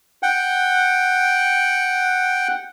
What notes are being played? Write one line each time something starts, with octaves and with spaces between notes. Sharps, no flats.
F#5 G5